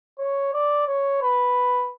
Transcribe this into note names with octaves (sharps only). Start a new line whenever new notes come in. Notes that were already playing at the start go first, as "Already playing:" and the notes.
C#5
D5
C#5
B4